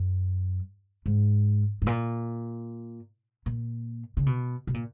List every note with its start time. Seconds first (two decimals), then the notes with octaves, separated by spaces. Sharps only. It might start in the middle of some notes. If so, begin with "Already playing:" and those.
Already playing: F#2
1.06 G#2
1.82 G#2
1.87 A#2
3.46 A#2
4.17 C#3
4.26 B2
4.67 B2
4.74 A#2